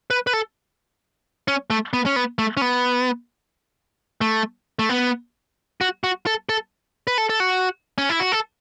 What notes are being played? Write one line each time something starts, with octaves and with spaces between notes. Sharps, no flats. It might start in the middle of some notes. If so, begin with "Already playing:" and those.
B4
B4
A4
C#4
A3
B3
C#4
B3
A3
C#4
B3
A3
A3
B3
F#4
F#4
A4
A4
B4
A4
A4
F#4
C#4
E4
F#4
A4